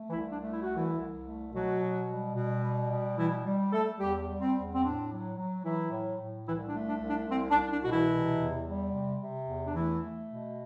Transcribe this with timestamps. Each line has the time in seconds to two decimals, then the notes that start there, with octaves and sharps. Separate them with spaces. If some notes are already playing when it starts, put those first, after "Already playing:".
Already playing: A3
0.09 E3 E4
0.16 C2
0.30 D4
0.43 A3
0.51 E4
0.62 F#4
0.71 C2 E3 E4
0.99 C2
1.26 A3
1.53 B2 F#3 F#4
1.80 B2
2.09 G3
2.35 B2
2.62 G3
2.90 B2
3.17 E3 G3 E4
3.46 G3
3.72 G3 A3 A4
3.99 E2 G3 G4
4.28 G3
4.41 C4
4.55 E2
4.73 C4
4.82 A2 D4
5.10 F#3
5.37 F#3
5.64 E3 F#3 E4
5.91 A2
6.20 A2
6.46 C2 E3 E4
6.68 D4
6.75 A3
6.87 D4
7.02 C2
7.08 D4
7.28 C2 C4
7.50 D4
7.56 C2
7.71 D4
7.82 B2 F#4
7.90 E3 E4
8.11 C3
8.39 E2
8.66 G3
8.93 C3
9.21 C3
9.48 E2
9.66 D4
9.75 E3 A3 E4
10.03 A3
10.30 B2